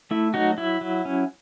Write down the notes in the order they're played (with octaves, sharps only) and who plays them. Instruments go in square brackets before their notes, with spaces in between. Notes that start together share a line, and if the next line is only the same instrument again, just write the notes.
[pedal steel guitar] A3 E4
F#3 D#4 F#4
F#3 E4
F#3
C#4